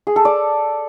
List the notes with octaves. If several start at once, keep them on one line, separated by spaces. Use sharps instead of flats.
G#4
A4
D5